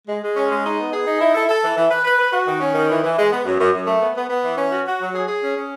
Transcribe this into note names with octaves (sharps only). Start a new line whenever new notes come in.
G#3
G#3
C#4
G#3
D#4
B3
G#4
D#4
E4
A4
A4
E3
E3
B4
B4
B4
F#4
D#3
C#4
D#3
E3
E3
G#3
B3
F#2
F#2
F#2
A3
B3
B3
B3
E3
C#4
F#4
F#4
F#3
G#4
G#4
C#4
C#4